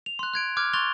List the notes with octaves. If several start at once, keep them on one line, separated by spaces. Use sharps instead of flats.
F7
C6 F#6
F#6 G#6 D7
D6 F6 F#6 G#6
C6 C#6 F#6 A6 F7 G7